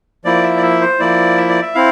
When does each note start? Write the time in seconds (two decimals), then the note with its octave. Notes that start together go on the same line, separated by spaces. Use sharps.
0.25 F3 A#3 E4 D5
0.43 E5
0.57 D5
0.63 E5
0.81 C5
0.99 F3 A#3 E4 D5
1.38 E5
1.49 D5
1.62 E5
1.75 C4 E4 F5